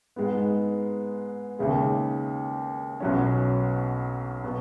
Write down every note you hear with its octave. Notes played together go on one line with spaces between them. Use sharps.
G#2 G#3 B3
D#2 C#3 G#3
B1 B2 F#3 C#4
B2